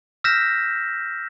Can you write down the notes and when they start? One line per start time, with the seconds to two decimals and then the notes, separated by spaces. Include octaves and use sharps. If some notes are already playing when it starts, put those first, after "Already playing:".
0.24 E6 F6 G6 A#6 B6 E7